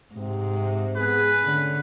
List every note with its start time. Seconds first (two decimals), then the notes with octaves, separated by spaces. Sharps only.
0.16 G#2 C3
0.96 B3 G#4 B4
1.44 D3 A3 C#4 D4